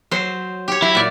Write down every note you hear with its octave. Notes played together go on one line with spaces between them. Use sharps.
F#3 C5
G4 C#5
F#3 E4
A#2 D5